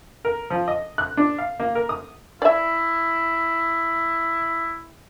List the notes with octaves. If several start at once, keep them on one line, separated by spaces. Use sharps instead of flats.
A#4
F3
D#5
F#6
D4
F5
A#3
A#4
D#6
E4 D5 E5